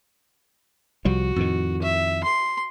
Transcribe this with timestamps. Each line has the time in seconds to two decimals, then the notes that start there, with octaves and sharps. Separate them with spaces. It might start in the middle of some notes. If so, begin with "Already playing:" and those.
1.05 C2 F3 G3 F#4
1.36 F2 A2 D#3
1.82 E5
2.24 C6